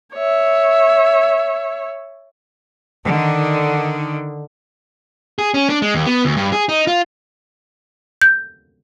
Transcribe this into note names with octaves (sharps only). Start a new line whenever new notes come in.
C#5 E5
D3 D#3
G#4
C#4
D4
G#3
D#2
B3
D2
G2
G#4
D#4
F4
G6